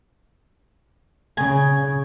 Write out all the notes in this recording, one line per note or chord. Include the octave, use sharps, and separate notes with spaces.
C#3 G#5